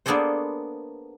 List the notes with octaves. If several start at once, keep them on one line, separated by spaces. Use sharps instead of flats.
A#3 B3 D4 G#4 A4 C5